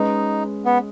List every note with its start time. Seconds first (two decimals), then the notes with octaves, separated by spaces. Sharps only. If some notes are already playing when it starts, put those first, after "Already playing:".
Already playing: G#3 C#4 D#4 B4 D#5
0.65 B3